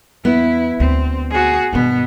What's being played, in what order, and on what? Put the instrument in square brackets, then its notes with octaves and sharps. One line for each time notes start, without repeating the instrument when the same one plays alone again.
[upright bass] E2 [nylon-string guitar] B3 [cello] E4
[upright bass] D2 [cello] C4
[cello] F#4 G#4
[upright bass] G2 D#3 [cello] B2 B3